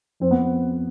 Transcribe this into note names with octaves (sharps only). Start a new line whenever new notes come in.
F2 C4
B3